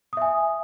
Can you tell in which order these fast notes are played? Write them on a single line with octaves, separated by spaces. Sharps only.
D#6 E5 G#5